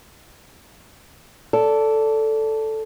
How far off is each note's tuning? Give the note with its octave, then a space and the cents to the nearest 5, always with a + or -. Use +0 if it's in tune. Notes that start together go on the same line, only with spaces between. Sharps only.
A4 +0 D5 -25